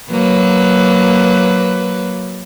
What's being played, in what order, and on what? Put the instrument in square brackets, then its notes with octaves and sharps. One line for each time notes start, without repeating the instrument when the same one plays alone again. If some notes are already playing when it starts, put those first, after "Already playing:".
[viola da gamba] F#3 A#3 B4